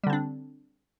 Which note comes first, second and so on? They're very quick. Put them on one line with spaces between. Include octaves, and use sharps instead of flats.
G3 D3 C4 D4